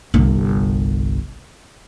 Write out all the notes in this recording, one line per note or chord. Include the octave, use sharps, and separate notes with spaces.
G1 C2